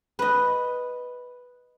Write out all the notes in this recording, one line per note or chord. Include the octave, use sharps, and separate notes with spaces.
B4 D#5